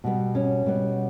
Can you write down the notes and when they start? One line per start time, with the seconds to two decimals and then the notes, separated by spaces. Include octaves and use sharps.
0.04 B2 G3 B3
0.35 C#4
0.66 B2 G3 B3